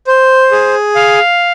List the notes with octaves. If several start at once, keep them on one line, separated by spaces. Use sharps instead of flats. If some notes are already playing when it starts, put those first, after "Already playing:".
C5
G#4
F5